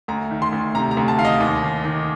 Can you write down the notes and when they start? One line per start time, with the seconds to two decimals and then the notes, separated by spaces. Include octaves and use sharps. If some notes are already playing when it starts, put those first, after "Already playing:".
0.08 D2 A#5
0.31 D#3
0.42 C6
0.52 D2
0.75 C3 A#5
0.91 A#5
0.97 D2
1.08 A5
1.18 D#3 F5
1.25 D#5
1.40 D#2
1.62 D#3
1.84 D#3